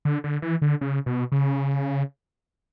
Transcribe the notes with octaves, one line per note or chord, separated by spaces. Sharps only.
D3
D3
E3
D3
C#3
B2
C#3